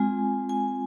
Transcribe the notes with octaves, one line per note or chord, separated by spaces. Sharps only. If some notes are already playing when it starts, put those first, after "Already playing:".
Already playing: G#3 C4 F4 G#5
G#5